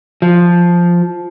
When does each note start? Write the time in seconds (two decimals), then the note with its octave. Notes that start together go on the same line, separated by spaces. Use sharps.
0.22 F3